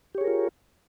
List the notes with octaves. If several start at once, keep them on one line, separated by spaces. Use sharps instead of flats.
F4 G4 G#4 A#4 C#5